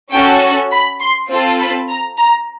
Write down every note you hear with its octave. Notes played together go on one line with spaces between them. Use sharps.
C#4 F#4 A4 G5
B5
C6
C4 F4 A4
B5
A#5
A#5